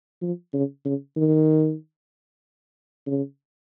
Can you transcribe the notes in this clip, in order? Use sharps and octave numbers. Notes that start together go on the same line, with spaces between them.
F3
C#3
C#3
D#3
C#3